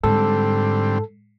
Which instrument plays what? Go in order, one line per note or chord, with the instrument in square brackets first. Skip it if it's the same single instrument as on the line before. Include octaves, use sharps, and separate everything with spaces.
[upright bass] G#2 [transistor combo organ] D3 G3 C4 [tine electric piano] A4